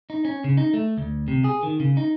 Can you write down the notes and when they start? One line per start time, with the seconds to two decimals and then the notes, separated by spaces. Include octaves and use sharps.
0.10 D#4
0.25 C#4
0.44 C#3
0.57 D#4
0.73 A3
0.97 D2
1.28 C3
1.44 G#4
1.63 D#3
1.80 C#3
1.97 D#4